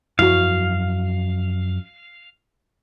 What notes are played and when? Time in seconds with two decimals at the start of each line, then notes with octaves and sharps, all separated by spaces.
0.19 F#2 F3 F#3 E4 F#4 F5